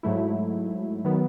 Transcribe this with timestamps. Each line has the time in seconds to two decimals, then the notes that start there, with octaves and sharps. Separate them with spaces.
0.03 G#2 F#3 A3 E4
1.05 D#3 F#3 B3